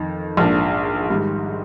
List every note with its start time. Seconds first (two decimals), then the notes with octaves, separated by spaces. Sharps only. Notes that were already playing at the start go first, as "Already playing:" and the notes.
Already playing: F2 D#3 D#4
0.37 A#1 G#2 F3 A#3 D4
1.10 G#2 D#3 G3